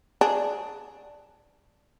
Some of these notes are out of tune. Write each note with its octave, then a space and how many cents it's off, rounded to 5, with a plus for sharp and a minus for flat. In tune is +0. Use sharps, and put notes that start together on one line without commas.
D4 +0 G#4 +10